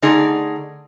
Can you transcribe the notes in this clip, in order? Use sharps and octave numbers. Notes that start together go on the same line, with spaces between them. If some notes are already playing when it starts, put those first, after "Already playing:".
D3 A3 D#4 G#4 D5